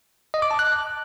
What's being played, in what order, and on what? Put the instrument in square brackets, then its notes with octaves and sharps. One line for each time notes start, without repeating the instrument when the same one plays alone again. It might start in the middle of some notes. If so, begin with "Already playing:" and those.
[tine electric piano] D#5
D6
A5
F#6